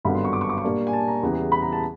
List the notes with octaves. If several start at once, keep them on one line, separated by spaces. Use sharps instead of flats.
G#1 G2 D3 F#3 B3 B5
C6
C#6
D6
C#6
D6
C#6
A#2 G3 A#3 D4
G#5
A5
A#5
E2 C#3 E3 G3 B3
B5
A#5
A5